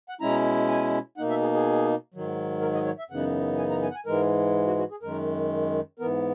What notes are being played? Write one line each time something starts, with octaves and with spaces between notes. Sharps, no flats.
F#5
B2 G#3 C#4 E4 A#5
G#5
B2 A#3 D#4 F#5
E5
G#4
G#4
G#2 D#3 F#3
A#4
D#5
C#5
E5
F#2 C#3 E3 B3 D#4 F#5
G#5
A#5
G#5
F#5
G#5
G#2 E3 G#3 A#4
F#4
F#4
G#4
F#2 D#3 G#3 A#4
G#2 E3 B3 A#4